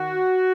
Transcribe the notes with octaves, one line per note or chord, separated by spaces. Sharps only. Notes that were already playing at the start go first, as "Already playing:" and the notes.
Already playing: D#3 F#4